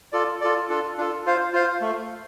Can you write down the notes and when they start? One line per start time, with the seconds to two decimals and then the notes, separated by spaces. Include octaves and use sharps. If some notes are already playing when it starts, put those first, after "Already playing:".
0.12 F4 A4 D5
0.41 F4 A4 D5
0.69 D4 F4 A4
0.98 D4 F4 A4
1.25 F4 C5 F5
1.53 F4 C5 F5
1.81 A3